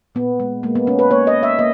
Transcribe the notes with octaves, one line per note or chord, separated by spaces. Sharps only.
A#2 B3
G#3
G#3 A#3
B3
G#3 C#4
B4
A#3 C#5
D#5
A#3
E5
A#3 D#5